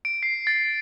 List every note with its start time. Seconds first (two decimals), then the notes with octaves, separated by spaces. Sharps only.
0.05 D7
0.23 C7
0.47 A6